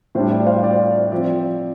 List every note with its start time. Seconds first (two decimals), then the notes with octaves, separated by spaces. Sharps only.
0.15 A2 G3 D4 C5
0.31 D5
0.47 C5 F5
0.64 D5
0.72 C5
0.83 D5
1.12 F3 C4 D5